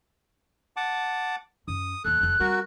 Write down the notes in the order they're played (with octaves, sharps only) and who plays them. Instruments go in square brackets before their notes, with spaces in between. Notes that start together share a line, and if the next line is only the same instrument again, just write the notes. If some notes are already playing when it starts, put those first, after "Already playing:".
[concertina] F#5 A5 D6
[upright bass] F#2 C#4 [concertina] D#6
[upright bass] E2 A#2 [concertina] A4 [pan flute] F#6
[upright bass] E1 F2
[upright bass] G3 C4 [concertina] F#4 A#4